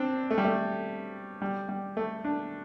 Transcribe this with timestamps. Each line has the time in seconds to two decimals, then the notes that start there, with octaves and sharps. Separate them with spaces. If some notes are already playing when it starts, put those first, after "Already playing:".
Already playing: C4 D4
0.31 A3
0.38 G3
0.45 A3
1.42 G3
1.69 G3
1.97 A3
2.24 D4